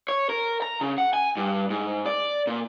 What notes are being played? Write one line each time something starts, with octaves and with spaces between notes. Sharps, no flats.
C#5
A#4
A#5
C#3
F#5
G#5
G2
G#2
D5
A#2